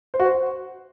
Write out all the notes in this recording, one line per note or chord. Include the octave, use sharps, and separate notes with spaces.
C5
F#4
C5